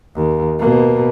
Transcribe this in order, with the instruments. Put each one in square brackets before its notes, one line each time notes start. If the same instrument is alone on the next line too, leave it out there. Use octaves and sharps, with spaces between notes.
[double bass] D#2
B2 A#3